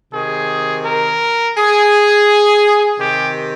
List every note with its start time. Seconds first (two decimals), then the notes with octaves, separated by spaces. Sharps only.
0.13 C3 D#3 G#4
0.85 A#4
1.57 G#4
2.99 C3 D#3 G4